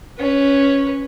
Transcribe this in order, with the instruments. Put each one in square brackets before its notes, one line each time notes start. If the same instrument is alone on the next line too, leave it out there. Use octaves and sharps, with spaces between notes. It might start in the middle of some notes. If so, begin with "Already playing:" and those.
[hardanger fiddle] C#4 B4